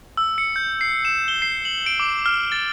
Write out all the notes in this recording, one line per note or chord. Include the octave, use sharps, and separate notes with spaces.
E6
C#7
G6
C7
E7
G7
C7
F#7
D7
D6
F6
A6